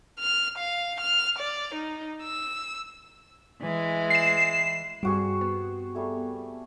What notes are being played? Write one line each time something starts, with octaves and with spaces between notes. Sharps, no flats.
F6
F5
F6
D5
D#4
E6
E3 G#3
C7 E7
G2 G3 C4 F#4 G#4
B3
G3 A3 G#4